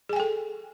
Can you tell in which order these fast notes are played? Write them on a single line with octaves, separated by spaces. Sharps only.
G#4 G#5 G5 A4